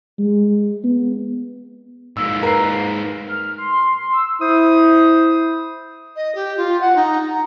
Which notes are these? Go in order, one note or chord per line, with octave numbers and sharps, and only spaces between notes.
G#3
B3
G#2 A#3 E6
A#4 B4 C7
F6
C6
E6
E4 C5 D#6
D#5
G4
F4
F#5
D#4
A#5